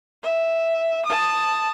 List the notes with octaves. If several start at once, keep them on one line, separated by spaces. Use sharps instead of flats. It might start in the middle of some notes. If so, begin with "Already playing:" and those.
E5
A5 D#6